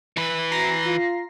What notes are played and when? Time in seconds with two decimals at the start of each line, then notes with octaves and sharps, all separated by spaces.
0.17 E3 B4
0.52 C4 E4 F#4 A#5 A#6 C7
0.86 F4